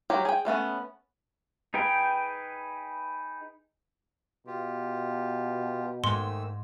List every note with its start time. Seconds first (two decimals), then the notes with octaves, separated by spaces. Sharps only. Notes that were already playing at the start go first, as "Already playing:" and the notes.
0.10 F#3 G3 G4
0.25 G#4 G5
0.45 G3 A3 B3 C#4
1.74 D#4 G#4 B4 G5
4.47 B2 F4 G4
6.04 G#2 D#3 G#3 A3 C6 E6